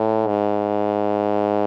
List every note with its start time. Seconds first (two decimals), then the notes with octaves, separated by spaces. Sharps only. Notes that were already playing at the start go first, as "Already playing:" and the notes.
Already playing: A2
0.27 G#2